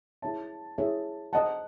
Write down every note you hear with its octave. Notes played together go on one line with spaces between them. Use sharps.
E4 G#4 C#5 E5 A5
E4 G#4 C#5 E5
C5 D#5 F#5 A5